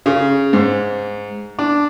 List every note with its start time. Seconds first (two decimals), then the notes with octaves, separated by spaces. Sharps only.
0.06 C#3
0.53 G#2
1.59 D4